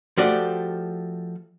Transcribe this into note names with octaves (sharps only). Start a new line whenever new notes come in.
F3 A3 F#4 G4 D5